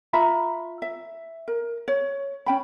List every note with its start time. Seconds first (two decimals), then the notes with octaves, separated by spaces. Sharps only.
0.13 F4 E5 A#5 B5
0.82 E5
1.48 A#4
1.88 C#5
2.46 C#4 G5 B5